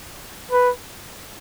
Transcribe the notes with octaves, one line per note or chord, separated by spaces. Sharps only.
B4